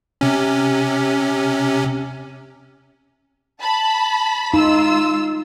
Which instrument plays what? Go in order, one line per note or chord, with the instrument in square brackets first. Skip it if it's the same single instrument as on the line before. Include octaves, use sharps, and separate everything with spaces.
[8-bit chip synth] C3 C#4
[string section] A5 B5
[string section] G#3 F4 E6 [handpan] D#4